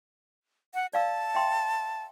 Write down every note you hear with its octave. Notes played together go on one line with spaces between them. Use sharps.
F#5
D5 F5 A5 E6
E5 G5 C6